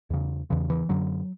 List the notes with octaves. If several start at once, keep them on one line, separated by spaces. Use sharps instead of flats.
E2 C#3
E2 C#3 E3
E3
F#2 D3 F#3